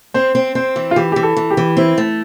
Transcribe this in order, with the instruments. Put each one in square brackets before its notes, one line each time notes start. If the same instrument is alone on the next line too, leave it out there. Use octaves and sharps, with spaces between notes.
[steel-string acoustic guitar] C4 [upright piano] C5
[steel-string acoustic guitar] C4
[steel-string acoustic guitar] C4 [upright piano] C5
[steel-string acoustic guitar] E3
[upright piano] F4
[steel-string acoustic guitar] E3 [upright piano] G4
[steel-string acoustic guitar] E3 [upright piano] G4
[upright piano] A4
[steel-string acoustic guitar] E3
[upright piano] G4
[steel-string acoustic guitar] E3
[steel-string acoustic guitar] C4 [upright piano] E4
[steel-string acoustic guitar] A3